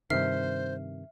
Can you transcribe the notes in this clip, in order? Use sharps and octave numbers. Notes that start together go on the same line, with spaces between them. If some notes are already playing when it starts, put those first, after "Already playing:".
G2 C3 D#3 C5 E5 F6 C7